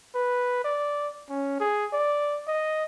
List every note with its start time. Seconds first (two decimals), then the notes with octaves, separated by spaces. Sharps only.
0.15 B4
0.64 D5
1.29 C#4
1.60 G#4
1.93 D5
2.48 D#5